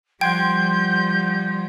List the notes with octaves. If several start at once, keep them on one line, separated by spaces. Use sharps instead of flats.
F3 G3 F#5 G5 C6 G6 G#6